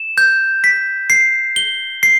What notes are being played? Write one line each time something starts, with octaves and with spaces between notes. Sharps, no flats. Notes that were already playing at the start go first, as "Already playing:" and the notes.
Already playing: E7
G6
B6
C7
G7
C7